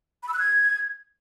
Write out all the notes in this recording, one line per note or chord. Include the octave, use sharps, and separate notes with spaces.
B5
E6
F#6
G#6